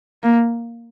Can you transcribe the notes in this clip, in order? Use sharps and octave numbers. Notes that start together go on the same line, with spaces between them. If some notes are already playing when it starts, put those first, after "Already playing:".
A#3